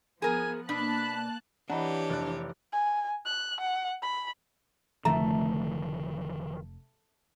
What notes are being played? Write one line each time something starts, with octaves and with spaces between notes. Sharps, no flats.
F3 B3 G#4 A#4 G#5
B2 A#3 D4 A5 B5 F#6
E3 D4 G4 C#5 D#5 F#5 A#5 B5
F1 D5 F#6
G#5
F#6
F#5
B5
F1 D3 D#3 F3 A3 A#5